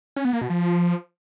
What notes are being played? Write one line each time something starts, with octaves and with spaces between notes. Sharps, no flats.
C#4
B3
A#3
B2
F3